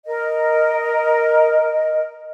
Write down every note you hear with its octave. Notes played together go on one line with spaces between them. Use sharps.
A#4 D#5